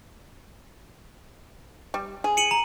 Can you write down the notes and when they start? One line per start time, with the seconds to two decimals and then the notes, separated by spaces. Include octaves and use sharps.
1.94 G3
2.24 G#4
2.37 C#7 D#7 F#7
2.51 A#5